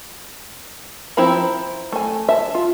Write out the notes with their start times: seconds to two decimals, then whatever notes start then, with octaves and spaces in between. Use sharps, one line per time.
1.17 F3 C4 E4 A#5 B5
1.92 A3 G#5
2.29 E5 A5
2.55 F4